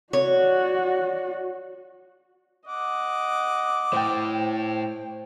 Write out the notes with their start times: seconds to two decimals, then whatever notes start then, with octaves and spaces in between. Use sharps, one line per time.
0.13 F#4 C#5 D5
2.67 D#5 F#5 D6
3.93 A2 C5 G5